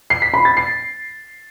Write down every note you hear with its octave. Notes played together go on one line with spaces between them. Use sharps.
C7
B6
B5
A6
C7